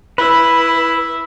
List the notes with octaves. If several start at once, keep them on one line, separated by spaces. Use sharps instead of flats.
E4 B4